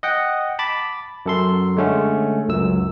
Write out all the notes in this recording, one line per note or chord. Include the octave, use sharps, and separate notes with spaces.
D#5 F#5 G5
A5 B5 D6 A6
F#2 A4 C6
D3 G#3 A3 C#4
C#2 F#2 E6